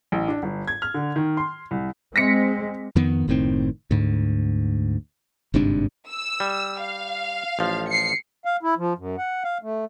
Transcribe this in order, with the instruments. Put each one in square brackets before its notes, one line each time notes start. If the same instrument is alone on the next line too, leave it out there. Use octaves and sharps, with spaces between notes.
[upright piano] A1
D4
G1
G#6
F6
D3
D#3
C6
C2
[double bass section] G#3 C4 [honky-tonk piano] A#6 B6 C#7
[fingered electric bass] F2 D#3 B3
F#1 A2 D#3 C4
D2 G#2
G1 G#2 C3 D4
[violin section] E6
[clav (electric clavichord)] G3
[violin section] F5
[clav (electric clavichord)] A1 F3
[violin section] C7 C#7
[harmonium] F5
E4
F3
F#2
F#5
F5
A3